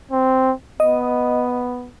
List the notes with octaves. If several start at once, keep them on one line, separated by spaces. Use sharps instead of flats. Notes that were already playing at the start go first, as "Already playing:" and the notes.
C4
B3 D#5